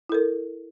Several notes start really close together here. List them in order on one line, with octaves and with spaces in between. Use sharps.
E4 A4 A#4